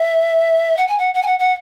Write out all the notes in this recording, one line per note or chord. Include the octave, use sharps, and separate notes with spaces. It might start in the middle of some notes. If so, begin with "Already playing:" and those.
Already playing: E5
F#5
G#5
F#5
F#5
G#5
F#5
F#5